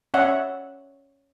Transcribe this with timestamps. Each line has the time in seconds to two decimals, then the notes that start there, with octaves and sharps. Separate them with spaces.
0.14 C#4 C#5 D5 E5 F#5